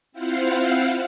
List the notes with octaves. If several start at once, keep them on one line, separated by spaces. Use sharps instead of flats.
C4 E4 F4 C5 F5 F#5